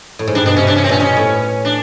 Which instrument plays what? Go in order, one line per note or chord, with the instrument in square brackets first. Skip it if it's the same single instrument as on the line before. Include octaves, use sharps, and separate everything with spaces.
[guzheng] A2
G#2
[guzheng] G2 [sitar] D4
[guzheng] B2 [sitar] D4
[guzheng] C3 [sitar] C#4
[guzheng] C3 [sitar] D4
[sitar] C#4
[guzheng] C3
[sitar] C4
[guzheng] A#2 [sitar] C#4
[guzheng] B2 [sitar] C#4
[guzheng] A2
[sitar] D4